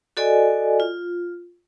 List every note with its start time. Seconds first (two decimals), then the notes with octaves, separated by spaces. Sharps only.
0.17 F#4 A4 D5 D#5 G#5
0.80 F4